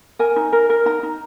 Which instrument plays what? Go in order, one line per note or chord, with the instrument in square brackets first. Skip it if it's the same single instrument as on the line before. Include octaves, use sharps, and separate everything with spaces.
[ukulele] A#4 G#5
D#4
A#4
A#4
D#4 A#5
D#4